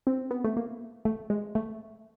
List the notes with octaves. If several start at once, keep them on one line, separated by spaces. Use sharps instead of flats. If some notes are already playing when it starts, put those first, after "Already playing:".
C4
B3
A3
A#3
A3
G#3
A3